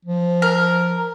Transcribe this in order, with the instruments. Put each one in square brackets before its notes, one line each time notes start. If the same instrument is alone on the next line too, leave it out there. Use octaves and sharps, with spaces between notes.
[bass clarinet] F3
[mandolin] A#4